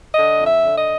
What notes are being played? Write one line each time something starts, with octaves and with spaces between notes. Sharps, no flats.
D3 D#5
F2
E5
D3
D#5